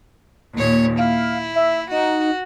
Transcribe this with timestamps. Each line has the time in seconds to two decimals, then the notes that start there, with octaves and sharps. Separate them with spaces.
0.54 D#2 A#2 C#5
0.98 E4 F5
1.55 E5
1.91 D#4 F#4